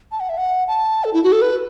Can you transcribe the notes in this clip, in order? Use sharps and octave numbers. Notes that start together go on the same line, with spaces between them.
A5
F#5
E5
F#5
A5
A4
E4
F#4
A4
B4